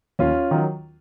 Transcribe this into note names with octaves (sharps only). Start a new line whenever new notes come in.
D#2 C#4 F4
D#3 F#3